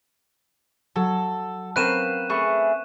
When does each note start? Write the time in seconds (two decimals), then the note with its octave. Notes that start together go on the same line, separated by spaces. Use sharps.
0.96 F#3 A4
1.76 C4 C#4 A#4 B4 F5 F#6 D#7 E7
2.30 A3 G#4 B4 C#6